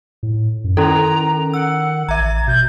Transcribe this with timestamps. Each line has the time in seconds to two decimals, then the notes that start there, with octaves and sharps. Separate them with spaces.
0.23 A2
0.64 F#2
0.77 D#3 C#4 E4 A4 A#5
1.54 F#5 E6
2.09 A1 E5 A#5 G#6
2.48 B2 G6